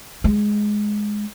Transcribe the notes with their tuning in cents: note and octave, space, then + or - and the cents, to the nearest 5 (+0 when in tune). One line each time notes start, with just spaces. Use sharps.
G#3 +5